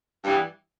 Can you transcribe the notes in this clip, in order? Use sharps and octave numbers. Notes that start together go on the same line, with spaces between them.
G2 E3 G3 B3 D4